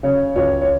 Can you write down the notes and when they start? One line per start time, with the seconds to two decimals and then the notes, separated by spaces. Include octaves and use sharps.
0.03 C#3 C#5
0.36 C#2 C#5
0.61 C#5